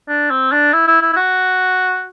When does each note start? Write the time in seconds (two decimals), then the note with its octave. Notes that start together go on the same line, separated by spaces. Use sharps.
0.08 D4
0.30 C4
0.52 D4
0.73 E4
0.87 E4
1.02 E4
1.12 E4
1.16 F#4